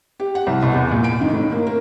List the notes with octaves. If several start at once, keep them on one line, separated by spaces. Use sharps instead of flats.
G4
F#5
C2
B2
E2
A#2
D7
D#3
A2
A#3
A#4